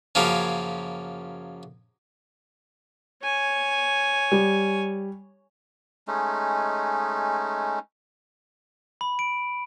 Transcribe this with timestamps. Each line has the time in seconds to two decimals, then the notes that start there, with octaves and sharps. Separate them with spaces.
0.15 F#2 C#3 F3 A#3 C#4
3.22 C#5 G#5
4.32 G3
6.08 G#3 A3 C#4 D#4
9.01 B5
9.19 D7